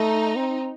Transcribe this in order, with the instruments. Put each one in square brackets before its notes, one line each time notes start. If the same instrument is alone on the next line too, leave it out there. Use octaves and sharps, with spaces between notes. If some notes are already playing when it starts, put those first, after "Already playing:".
Already playing: [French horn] A3 [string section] D#4
[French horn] C4